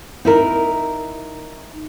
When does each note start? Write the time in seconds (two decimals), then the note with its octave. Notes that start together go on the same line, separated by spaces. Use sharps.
0.25 D#4 E4 A#4